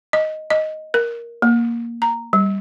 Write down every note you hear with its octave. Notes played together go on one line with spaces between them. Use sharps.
D#5
D#5
A#4
A#3
A#5
G3